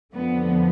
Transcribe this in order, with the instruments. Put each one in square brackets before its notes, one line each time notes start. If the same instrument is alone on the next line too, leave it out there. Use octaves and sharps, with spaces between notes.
[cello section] F2 D3 F3 B3